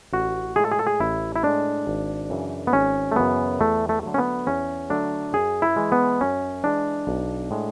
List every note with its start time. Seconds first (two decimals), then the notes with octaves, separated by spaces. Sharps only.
0.13 A1 F#4
0.56 A2 G#3 G#4
0.65 A4
0.72 G#4
0.79 A4
0.87 G#4
1.00 A1 E4
1.36 E4
1.43 A2 G#3 D4
1.87 G#1
2.30 F#2 C#3 E3
2.67 B3
2.73 G#1 C#4
3.12 A3
3.16 F#2 C#3 E3 B3
3.60 E2 A3
3.89 A3
4.03 D3 F#3 A3
4.14 C#4
4.18 B3
4.47 E2 C#4
4.90 D3 F#3 A3 D4
5.33 F#2 G#4
5.62 E4
5.76 E3 G#3
5.92 B3
6.21 F#2 C#4
6.64 E3 G#3 D4
7.07 B1
7.51 A2 G#3